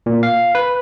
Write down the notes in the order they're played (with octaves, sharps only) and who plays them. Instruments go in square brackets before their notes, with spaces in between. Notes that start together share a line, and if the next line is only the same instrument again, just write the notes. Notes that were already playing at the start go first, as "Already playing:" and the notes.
[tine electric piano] A#2
F5
B4